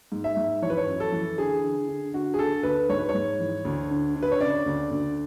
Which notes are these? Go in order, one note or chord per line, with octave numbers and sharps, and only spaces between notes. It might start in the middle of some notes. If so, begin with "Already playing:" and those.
G#2
E5
G#2
E3 C#5
B4
C#5
F#2
A4
E3
D3 G#4
D3
D3
D3 F#4
G#4
D3 A4
D2 B4
G#2 C#5
B4
C#5
G#2
E3
D2
D3
D3
B4
C#5
C#3 D5
D2
D2